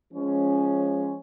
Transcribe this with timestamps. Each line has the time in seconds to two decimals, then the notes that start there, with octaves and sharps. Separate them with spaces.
0.14 F3 G#3 C#4